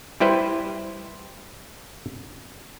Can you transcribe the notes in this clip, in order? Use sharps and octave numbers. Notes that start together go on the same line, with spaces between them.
G3 E4 G4 B4 C5